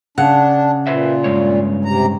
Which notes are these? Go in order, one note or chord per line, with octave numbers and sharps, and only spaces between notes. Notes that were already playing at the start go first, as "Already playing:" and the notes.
C#3 D4 F#5
A#2 B4 C5 E5
G2 G#3 C#5
C3 A#5